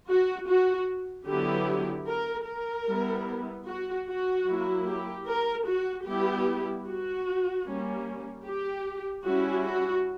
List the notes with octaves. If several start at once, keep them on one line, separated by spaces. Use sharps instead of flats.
F#4
F#4
D3 F#3 B3 E4 G4
A#4
A#4
G3 B3 E4
F#4
F#4
F#3 A#3 E4
G4
A#4
F#4
G3 B3 E4 G4
F#4
G3 A#3 C#4
G4
G3 C#4 E4 F#4
F#4